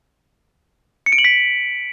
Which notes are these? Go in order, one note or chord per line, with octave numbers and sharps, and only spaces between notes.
C#7
D7
F#7
B6